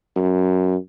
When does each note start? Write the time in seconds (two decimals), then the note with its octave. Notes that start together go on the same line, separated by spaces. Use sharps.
0.16 F#2